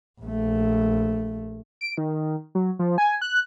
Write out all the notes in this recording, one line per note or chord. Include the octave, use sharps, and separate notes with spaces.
A#1 A3
D7
D#3
F#3
F3
G#5
F#6